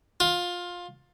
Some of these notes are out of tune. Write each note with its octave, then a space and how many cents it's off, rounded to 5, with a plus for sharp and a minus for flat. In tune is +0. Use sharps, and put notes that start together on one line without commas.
F4 +15